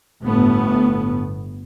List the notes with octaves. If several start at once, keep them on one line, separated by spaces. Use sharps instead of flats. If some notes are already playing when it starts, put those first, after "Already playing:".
G1 A2 A3 B3